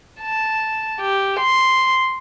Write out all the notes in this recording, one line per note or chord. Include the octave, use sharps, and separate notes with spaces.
A5
G4
C6